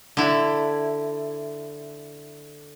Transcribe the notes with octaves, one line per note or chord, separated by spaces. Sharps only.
D3 E4